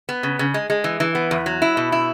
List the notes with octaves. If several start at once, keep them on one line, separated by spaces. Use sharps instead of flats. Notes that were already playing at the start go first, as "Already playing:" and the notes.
B3
C#3
C#3
G#3
G#3
E3
E3
B3
E2
F#3
E4
B2
E4